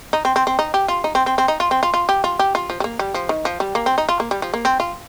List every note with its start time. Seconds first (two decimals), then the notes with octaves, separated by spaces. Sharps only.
0.13 D#4
0.25 C4
0.36 C4
0.47 C4
0.59 D#4
0.74 G4
0.88 F4
1.04 D#4
1.15 C4
1.26 C4
1.38 C4
1.48 D#4
1.60 F4
1.71 C4
1.83 F4
1.94 F4
2.09 G4
2.24 F4
2.39 G4
2.55 F4
2.70 F3
2.80 G3
2.84 A#3
2.99 G3
3.14 F3
3.29 D#3
3.45 F3
3.60 G3
3.75 A#3
3.86 C4
3.98 D#4
4.09 F4
4.20 A#3
4.31 G3
4.42 F3
4.54 A#3
4.65 C4
4.80 F4